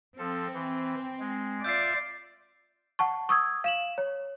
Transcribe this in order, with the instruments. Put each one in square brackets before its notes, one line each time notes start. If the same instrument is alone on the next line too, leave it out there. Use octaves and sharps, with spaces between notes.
[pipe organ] F3 A4 [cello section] C4
[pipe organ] E3
G#3
[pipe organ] F4 E5 [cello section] D5 [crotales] G6 C7
[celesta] F#5 A5 C#6
C#6 D#6 E6 G#6
F5 E7 F#7
C#5